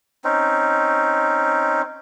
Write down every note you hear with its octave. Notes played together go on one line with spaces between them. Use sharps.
C4 C#4 D#4